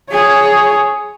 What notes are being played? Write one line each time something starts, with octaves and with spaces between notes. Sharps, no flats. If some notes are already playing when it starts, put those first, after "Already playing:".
G#4 C#5